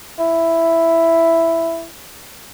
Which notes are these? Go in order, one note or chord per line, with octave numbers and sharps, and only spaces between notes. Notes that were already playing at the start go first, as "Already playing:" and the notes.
E4